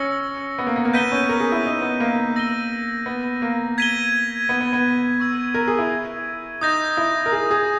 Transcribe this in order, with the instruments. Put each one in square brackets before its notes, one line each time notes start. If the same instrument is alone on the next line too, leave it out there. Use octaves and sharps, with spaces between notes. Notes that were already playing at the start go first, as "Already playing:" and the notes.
Already playing: [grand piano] C#4 [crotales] E6 A#6 C#7 G7
[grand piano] B3
A#3
B3
A#3
[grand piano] B3 [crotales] G6 B6 D#7 G7
[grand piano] C#4
A#4
G#4
E4
D#4
B3
A#3
[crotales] E6 A#6 D#7 G7
[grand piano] B3
A#3
[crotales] G#6 B6 D#7 G7
[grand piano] B3
B3
B3
[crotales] C#6 E6 G#6
[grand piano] A#4
G#4
E4
[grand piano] D#4 [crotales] D#6 G6 A#6
[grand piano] E4
A#4
G#4
G#4